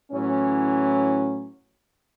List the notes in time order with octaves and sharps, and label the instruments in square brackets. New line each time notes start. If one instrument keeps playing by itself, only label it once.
[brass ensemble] A2 E3 F#3 C#4